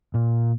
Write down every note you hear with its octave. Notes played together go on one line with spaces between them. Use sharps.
A#2